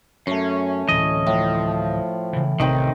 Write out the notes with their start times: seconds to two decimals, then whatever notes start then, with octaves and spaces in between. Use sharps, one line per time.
0.27 F#2 A3 C#4 C#5
0.89 D1 E3 D#5
1.27 A2 F3
2.33 C#3 E3
2.60 A1 C3 D#3 C4 D#4 D#5